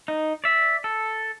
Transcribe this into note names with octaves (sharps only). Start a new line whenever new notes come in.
D#4
D5 E5
A4